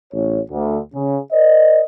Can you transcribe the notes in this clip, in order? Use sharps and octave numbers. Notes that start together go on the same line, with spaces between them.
A1 C#5
D2
C#3
A#4 C5 D5 D#5